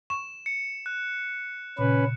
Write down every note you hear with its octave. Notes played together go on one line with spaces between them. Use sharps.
C#6 E7
C#7
F#6
A#2 C#3 C#4 B4